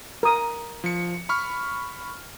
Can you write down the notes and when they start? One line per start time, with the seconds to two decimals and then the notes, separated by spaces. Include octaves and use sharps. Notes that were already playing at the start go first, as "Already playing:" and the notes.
0.23 A#4 D#6
0.84 F3 C#7
1.29 B5 C#6 F6